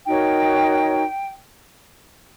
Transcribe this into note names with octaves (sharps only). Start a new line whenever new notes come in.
D#4 F#4 A#4 C#5 G5